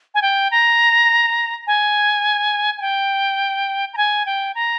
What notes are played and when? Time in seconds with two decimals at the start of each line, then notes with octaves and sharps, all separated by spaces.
0.14 G#5
0.22 G5
0.51 A#5
1.67 G#5
2.78 G#5
2.81 G5
3.93 A#5
3.97 G#5
4.26 G5
4.55 A#5